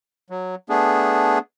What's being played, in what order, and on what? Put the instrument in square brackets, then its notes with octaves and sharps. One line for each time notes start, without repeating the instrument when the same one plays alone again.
[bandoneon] F#3
A3 B3 D4 G#4